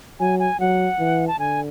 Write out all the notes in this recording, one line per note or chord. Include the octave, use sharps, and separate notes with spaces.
F#3 G#5
G#5
F#3 F#5
E3
A5
D3 G#5